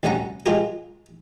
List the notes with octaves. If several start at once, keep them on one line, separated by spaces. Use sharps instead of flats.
D2 C3 G3 C#4 F#5 A#5
G#3 F4 G4 A#4